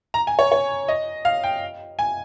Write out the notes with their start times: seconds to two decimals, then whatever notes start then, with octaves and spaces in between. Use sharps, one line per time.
0.14 A#5
0.27 G#5
0.39 C#5
0.52 C#5
0.88 D#5
1.25 F5
1.44 G5
1.99 G#5